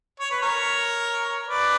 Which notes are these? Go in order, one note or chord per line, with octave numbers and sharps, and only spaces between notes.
C#5
B4
A#4 C#5
B4 D5